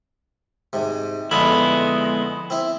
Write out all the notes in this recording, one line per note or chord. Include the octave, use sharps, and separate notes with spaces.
G#2 C3
F2 D3 G#3 B3 E4 B5
C4 E4